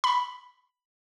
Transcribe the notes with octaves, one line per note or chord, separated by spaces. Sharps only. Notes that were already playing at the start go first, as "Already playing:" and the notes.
B5